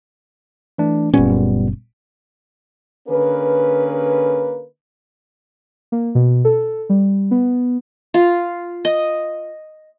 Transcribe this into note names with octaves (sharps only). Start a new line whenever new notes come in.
E3 A3 D4
F#1 A#2 G3 B3 C#4
D3 A#3 C#4 G#4 B4
A#3
B2
A4
G3
B3
F4
D#5